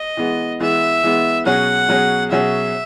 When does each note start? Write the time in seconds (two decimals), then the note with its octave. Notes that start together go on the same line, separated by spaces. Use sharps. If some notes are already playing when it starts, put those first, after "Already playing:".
Already playing: D#5
0.17 E3 G#3 B3
0.60 E3 G#3 B3 E5
1.03 E3 G#3 B3
1.46 B2 F#3 C#4 G#4 F#5
1.89 B2 F#3 C#4 G#4
2.31 B2 F#3 C#4 G#4 E5